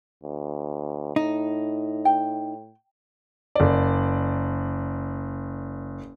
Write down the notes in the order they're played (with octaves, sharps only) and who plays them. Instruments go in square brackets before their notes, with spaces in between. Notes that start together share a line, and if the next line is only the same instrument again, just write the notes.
[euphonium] D2
[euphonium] A2 [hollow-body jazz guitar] D#4
[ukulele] G5
[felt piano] F#1 D5